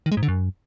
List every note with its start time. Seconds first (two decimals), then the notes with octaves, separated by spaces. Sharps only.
0.06 D#3
0.12 G#3
0.17 G#2
0.23 D3
0.28 F#2